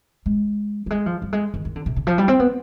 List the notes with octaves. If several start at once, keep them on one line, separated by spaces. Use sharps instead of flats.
G#3
G3
G#3
F3
G3
G#3
D#3
D#3
D3
C3
D3
F3
G3
C4
B3